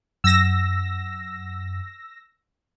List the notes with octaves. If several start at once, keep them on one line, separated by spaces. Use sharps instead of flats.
F#2 E6 A#6